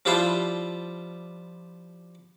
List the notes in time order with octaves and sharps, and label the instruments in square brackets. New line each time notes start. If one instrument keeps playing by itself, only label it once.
[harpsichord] F3 G3 D4 E4 F4 C5